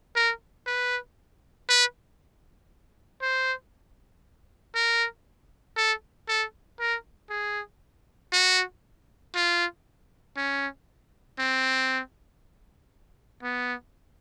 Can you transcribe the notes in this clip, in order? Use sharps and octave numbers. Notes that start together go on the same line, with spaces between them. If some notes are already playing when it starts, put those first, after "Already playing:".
A#4
B4
B4
C5
A#4
A4
A4
A#4
G#4
F#4
F4
C#4
C4
B3